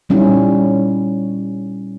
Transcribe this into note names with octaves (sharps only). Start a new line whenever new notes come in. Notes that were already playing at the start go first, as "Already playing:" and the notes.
A#2 G3 C#4 D#4 E4